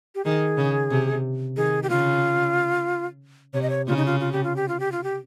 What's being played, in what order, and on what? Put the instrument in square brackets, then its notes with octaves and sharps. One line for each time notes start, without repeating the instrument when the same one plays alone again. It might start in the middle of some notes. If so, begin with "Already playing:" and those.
[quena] G4
[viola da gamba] D#3 [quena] G#4
[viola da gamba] C#3
C3
[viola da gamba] D#3 [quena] G#4
[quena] G4
[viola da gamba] C#3 [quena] F4
[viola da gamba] C3 [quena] C#5
[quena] D#5
C#5
[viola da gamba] C#3 [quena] F4
[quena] D#4
F4
F4
G4
F4
G4
F4
G4
F4
G4